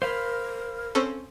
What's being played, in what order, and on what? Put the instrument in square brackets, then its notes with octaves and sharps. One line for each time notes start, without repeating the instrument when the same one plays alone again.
[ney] A#4 [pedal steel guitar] C5 F5 B5
[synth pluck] C4 C#4 A4